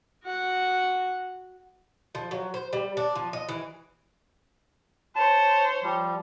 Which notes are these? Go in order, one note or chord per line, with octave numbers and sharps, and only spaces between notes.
F#4 F#5
F3
F#3
C5
G3
D4
F3
D#5
E3
C5 C#5 A5
F3 G3